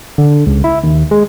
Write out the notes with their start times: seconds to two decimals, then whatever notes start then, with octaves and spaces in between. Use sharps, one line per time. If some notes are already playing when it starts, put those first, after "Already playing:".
0.18 D3
0.47 C#2
0.64 E4
0.83 D#2
1.11 G#3